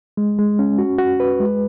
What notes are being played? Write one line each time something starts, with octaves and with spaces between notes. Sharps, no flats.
G#3
G#3
C#4
F#4
F#4
B4
G#3